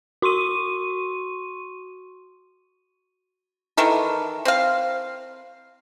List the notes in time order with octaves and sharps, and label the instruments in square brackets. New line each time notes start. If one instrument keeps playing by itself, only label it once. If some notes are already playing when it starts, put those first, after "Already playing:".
[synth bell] F#4 C6 C#6 D#7
[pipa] D#3 E3 A4 A#4
C4 F5